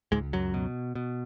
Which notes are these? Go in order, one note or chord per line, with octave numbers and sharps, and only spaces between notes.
C#2 G#2 G#3
F#2 F#3
B2
B2